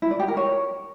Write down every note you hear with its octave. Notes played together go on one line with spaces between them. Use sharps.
E4
D5
G4
A#4
C#5